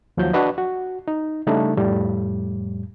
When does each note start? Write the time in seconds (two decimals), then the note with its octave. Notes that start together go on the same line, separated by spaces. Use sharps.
0.17 D#2 F3 F#3 G6
0.33 D4 F#4 B4 D#5
0.58 F#4
1.08 D#4
1.47 C#3 G3 A3 D4 D#4
1.77 F2 A2 G3